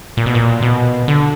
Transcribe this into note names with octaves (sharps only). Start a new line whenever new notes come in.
A#2
B2
A#2
B2
D3